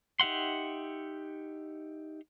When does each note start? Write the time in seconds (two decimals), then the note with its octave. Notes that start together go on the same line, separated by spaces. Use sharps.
0.20 D#4 G4 E5 F#5 C6